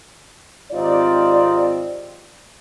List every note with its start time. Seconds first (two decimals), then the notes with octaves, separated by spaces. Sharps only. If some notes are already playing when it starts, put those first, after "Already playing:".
0.72 G#1 C4 D#4 F4 G4 D5